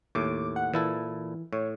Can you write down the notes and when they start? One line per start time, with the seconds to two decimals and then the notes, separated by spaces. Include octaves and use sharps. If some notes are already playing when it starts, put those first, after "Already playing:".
0.15 D#2 A2 D6
0.56 F#5
0.74 A#2 E3 E4 A4
1.53 A2 C#5